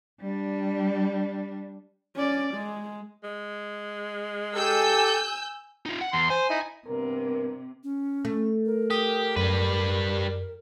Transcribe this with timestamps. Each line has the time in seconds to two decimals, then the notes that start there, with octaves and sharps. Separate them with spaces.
0.21 G3 D4
2.15 C#4 D5
2.54 G#3
3.24 G#3
4.55 G4 A4 G#5 E6 G6
5.86 D#4 F4
6.01 F#5
6.13 E2 C6
6.30 C5 G#5
6.50 D#4 E4
6.87 G2 C3 B3 A#4
7.84 C#4
8.25 A3
8.66 A#4
8.90 G4 D#6
9.36 F#2 G3 B4